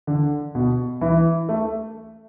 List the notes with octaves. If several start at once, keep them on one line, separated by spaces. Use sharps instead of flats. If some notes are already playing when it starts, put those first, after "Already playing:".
D3
B2
E3
A3